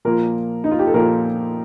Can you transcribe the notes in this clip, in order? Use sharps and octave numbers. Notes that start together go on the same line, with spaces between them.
A#2 F3 A#3 A#4
D#4
F4
G4
A4
A#2 F3 A#3 A#4